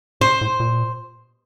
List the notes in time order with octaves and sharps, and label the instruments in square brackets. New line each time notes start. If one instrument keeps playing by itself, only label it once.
[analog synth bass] A2 [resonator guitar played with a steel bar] C5
[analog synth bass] A2
A#2